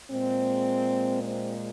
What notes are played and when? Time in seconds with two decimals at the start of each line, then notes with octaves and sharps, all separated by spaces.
0.11 A#2 G#3 C4
1.24 C4